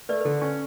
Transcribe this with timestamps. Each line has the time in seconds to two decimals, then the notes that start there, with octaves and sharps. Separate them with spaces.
0.09 A3 B4 D5
0.21 B4
0.25 D3 A4
0.42 C#4